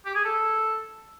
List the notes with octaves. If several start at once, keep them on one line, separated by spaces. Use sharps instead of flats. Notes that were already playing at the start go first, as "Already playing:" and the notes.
G4
G#4
A4